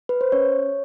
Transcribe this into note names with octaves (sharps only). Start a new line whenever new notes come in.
B4
C5
C#4 C#5